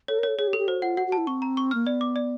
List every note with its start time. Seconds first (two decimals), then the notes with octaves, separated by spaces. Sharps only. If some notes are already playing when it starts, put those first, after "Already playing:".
0.08 A4 C#5
0.19 A#4
0.23 A4 C#5
0.38 G#4 C#5
0.48 G4
0.53 A4
0.59 G4
0.67 F#4 C5
0.82 F4 F#5
0.97 F#4 F#5
1.07 F#4
1.12 A5
1.18 E4
1.27 C4 C#6
1.42 A#5
1.57 C#6
1.71 A#3 F6
1.86 B3 D5
2.01 D6
2.16 D5